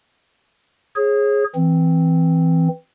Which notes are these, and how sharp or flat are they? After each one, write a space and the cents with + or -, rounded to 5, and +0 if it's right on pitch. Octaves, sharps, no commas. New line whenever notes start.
G#4 +0 C#5 -35
E3 +0 C4 +0